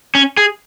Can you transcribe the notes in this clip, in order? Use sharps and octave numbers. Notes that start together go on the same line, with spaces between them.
C#4
G#4